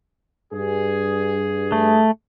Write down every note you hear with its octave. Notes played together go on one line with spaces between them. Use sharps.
G2 G#4
A3